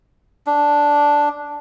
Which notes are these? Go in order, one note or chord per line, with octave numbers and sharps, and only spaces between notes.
D4